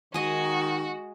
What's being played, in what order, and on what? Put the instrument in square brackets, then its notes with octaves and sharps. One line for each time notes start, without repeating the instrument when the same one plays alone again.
[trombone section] D#3 [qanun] G#3 D#5 [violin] F#4